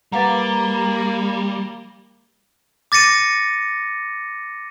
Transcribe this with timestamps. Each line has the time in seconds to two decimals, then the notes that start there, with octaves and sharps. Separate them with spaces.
0.12 G3 A#3 B4 F5 F#5 A#5 A6
2.92 D6 A6 A#6 C#7 D#7